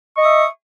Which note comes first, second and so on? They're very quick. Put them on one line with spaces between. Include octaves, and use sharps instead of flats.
C#6 D#5 D#6 E5